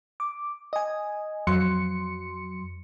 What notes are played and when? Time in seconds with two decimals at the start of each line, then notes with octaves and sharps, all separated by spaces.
0.20 D6
0.73 D#5 G#5
1.47 F2 F#3 C6 C#7